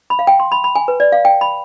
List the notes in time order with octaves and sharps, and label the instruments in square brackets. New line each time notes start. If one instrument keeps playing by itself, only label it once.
[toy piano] B5
F5
G5
C6
B5
B5
G#5
B4
D5
F5
G5
B5